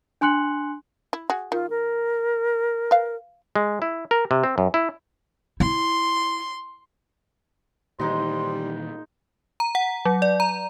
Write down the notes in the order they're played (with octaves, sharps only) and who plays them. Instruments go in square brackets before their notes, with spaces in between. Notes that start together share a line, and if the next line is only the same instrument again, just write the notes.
[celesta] D4 G#5 C6 F#6 C#7 F#7
[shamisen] E4
F#4 G#4
[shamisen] D#3 [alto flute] F4
[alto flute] A#4
[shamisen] B4 F5
[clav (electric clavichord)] G#3
E4
A#4
C3
C4
F#2
E4
[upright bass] E4 [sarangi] C6
[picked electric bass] A#2 D#3 E3 [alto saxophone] G3 [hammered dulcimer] G#3 D#4 D#5 [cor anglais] C5
[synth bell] A#5
F#5
F#3
D5
A#5